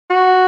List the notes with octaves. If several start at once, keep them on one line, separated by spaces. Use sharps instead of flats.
F#4